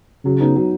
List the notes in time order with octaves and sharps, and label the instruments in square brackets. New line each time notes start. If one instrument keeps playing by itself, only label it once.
[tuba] C#3 [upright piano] F#3
[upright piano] B3 D#4
F#3